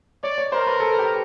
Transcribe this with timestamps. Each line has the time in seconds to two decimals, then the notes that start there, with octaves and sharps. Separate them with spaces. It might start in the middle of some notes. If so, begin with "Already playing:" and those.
0.23 C#5 D5
0.38 C#5
0.52 A#4 C5
0.67 B4
0.80 A4
0.99 G4